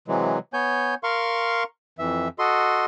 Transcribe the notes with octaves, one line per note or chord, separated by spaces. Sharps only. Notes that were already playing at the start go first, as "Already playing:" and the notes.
C3 E3 F#3 G#3
B3 C#5 G#5 G6
A#4 F5 C6 C#6
F2 E3 E5
F#4 A4 D#5 C6